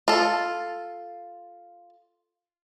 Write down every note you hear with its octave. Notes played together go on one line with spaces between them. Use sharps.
F4 A4